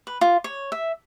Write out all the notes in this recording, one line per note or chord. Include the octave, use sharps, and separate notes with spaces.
B4
F4
C#5
E5